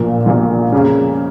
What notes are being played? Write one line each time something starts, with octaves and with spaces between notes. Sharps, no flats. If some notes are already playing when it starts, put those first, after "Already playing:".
Already playing: A#1 A#2 A#3 F4 A#4
A#1 A#2 A#3 F4 A#4
F2 C#3 A#3 C#4